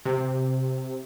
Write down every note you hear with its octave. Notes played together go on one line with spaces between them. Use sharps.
C3